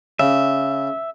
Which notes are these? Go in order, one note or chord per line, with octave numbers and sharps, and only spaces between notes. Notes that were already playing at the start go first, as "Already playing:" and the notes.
C#3 E5